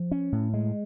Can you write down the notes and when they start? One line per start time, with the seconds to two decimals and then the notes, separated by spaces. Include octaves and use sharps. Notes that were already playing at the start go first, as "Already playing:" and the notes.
Already playing: F3
0.11 C#4
0.32 A2
0.54 G#3